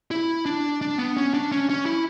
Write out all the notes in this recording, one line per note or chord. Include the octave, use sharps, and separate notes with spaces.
E4
D4
D4
B3
C#4
D4
C#4
C#4
E4